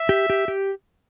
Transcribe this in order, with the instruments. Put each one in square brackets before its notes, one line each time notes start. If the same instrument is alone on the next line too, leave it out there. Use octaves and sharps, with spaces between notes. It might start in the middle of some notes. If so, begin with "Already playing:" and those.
Already playing: [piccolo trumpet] E5
[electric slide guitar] G4
G4
G4